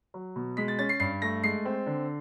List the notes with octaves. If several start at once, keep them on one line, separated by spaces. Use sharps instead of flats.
F#3
B2
G#3 B6
A6
C#4 A6
C7
G2 C7
A3 A#6
G#3 C7
C4
D3